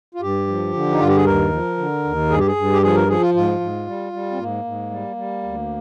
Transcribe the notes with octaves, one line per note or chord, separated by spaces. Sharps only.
F4
G2 G4
F3
D3
D#4
G2 F4
G4
G#4
D#2 A#4
F3
D3
D#2
G2 G#4
G4
G#4
G2
G4
F3 G#4
A#4
F3 G#4
F4
G#2 F4
G#2
G3
G3
C4
G#2 A#3
G#2
G3
G3
D2